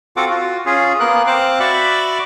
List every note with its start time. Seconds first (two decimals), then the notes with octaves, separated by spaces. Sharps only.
0.17 C4 F4 F#4 A4 F#5 D6
0.30 F4 F#4
0.66 C#4 F4 G#4
1.00 A#3 B3 A#4 F#6
1.27 C4 C5 F5 D6 F#6
1.60 F#4 D5 E5 B5 C#6 D6